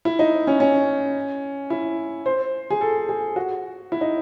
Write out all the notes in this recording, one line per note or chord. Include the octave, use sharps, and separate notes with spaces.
E4
D#4
C#4
C#4
E4
C5
G#4
A4
G#4
F#4
E4
D#4